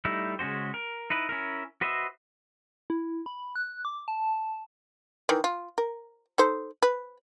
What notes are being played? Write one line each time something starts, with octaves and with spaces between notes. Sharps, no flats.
G3 A3 D#4 E4
C#3 G#3 C#4 F#4 C5
A#4
D#4 E4 B4
C#4 E4 A#4
F#4 B4 C5 D#5 E5
E4
B5
F#6
D6
A5
D#3 E3
F4
A#4
D#4 A4 C5
B4